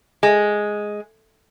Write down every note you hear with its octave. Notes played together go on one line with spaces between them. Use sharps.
G#3